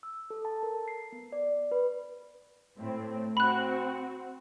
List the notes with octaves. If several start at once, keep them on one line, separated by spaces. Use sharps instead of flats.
E6
A4
A5
A#4
C7
B3
D5
B4
A2 C4
C4 F#4 B5 F#6